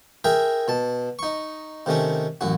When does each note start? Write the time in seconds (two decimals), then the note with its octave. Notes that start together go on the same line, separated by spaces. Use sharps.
0.24 G#4 A#4 E5 G5 A#5
0.68 B2 A5
1.19 D#4 C#6
1.86 C3 D#3 A3 C#4
2.41 A1 F#2 F#4